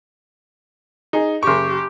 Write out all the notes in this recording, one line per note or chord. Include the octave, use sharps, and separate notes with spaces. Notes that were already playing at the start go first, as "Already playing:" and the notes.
D#4 G#4
F#1 G4 C#6